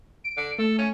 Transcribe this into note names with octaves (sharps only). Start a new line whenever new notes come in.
D7
D3
A3 A4
C#4